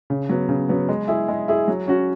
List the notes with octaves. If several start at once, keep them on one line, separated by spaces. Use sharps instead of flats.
C#3
F#3 B3
C#3
F#3 B3
G#3
E4 G#4
G#3
E4 G#4
F#3
C#4 F#4